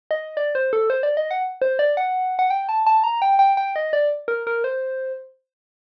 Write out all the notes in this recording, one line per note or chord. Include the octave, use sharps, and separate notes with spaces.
D#5
D5
C5
A4
C5
D5
D#5
F#5
C5
D5
F#5
F#5
G5
A5
A5
A#5
G5
G5
G5
D#5
D5
A#4
A#4
C5